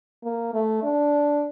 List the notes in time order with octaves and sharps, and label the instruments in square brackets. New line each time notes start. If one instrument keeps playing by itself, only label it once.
[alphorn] A#3
A3
D4